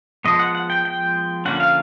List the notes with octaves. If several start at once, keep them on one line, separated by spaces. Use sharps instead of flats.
F3 G#3 B3 D#5
F#5
F#5
G5
G5
D3 F3 A#3 C#4 F#5
F5